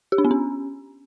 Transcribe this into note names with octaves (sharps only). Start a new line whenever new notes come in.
G4
D4
B3
C#4